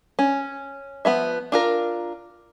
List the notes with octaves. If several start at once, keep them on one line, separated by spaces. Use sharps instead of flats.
C#4
F3 B3 C#4 E5
D4 F4 A#4